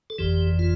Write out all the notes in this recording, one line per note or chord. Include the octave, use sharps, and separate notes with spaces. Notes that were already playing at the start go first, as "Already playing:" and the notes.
A4
G1 F2 E3 G4
F4